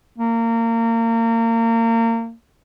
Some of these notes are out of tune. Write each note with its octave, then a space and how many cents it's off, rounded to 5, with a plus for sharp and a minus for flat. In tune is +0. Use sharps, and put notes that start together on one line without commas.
A#3 -30